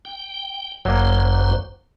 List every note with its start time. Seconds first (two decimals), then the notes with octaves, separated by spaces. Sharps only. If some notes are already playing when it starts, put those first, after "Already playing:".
0.05 G5
0.85 G1 F#2 F#3 A#3 C5